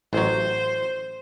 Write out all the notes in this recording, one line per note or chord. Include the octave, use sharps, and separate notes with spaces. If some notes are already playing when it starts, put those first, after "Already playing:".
A1 F#3 C5